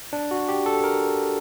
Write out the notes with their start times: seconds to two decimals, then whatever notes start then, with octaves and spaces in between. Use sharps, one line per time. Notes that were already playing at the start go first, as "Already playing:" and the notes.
0.13 D4
0.31 F#4
0.48 G4
0.66 A4
0.84 A#4